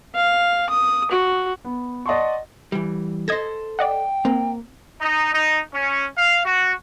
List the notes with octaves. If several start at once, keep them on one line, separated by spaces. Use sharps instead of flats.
F5
D#6
F#4
B3
D5 D#5 F#5 A5 C6 C#6
E3 G3
A4 C5 D#5 G#6 A#6
D5 D#5 F#5 G5
A#3 C4
D#4
D#4
C#4
F5
F#4